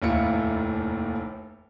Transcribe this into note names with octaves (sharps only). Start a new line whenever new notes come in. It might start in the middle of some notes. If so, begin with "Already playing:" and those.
F1 D#2 A2 E4 F4 C#7